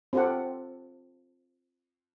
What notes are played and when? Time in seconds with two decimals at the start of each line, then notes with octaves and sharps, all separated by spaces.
0.13 C4 F4 G4 A4 F#5